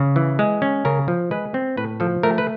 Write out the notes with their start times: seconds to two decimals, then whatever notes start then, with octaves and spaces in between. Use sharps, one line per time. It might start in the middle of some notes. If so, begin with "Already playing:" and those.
Already playing: C#3
0.16 E3
0.39 G#3
0.62 C#4
0.85 C#3 A#4
1.08 F3
1.31 G#3 B4
1.54 C4
1.77 A2 B4
2.00 F3 A4
2.23 A3 A#4
2.38 B4